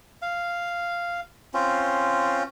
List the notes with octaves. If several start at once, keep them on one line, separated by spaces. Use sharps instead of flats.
F5
C4 C#4 F4